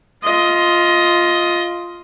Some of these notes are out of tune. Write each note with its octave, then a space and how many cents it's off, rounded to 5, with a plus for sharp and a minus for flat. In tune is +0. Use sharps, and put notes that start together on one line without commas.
F4 +0 D#5 +15